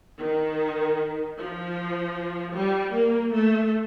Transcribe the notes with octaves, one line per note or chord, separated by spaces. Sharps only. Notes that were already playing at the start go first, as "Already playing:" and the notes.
D#3
F3
G3
A#3
A3